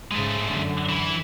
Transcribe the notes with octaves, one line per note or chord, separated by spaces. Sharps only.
G#2 C#3 G#3 A3
F#2 D3
E3 E4